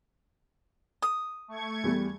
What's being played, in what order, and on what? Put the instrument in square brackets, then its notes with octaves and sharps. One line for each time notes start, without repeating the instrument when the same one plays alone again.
[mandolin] D#6
[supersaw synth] A3 C#6 G#6
[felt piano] E2 G3